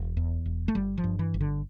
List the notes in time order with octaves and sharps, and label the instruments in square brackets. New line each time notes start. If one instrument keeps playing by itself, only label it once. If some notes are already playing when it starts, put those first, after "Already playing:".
Already playing: [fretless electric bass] E1
E2
E1
A3
G1 G3
F3
G2
E3
G1
D3